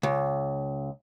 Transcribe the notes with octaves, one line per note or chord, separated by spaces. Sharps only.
C#2